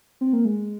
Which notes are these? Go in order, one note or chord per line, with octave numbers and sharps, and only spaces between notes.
C4
A#3
G#3